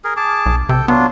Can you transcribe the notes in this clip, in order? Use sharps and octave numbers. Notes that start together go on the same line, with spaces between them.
G#4 A#4
G#4 A5 D6
B1
C3 A4 G5
F#3 B3 D4 F4